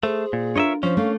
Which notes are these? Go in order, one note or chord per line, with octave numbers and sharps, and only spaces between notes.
A3 G#4 C5
A#2
D4 F4 A#4 C#5 D#5 E5
F3 C#4 C5
A3 A#3 F5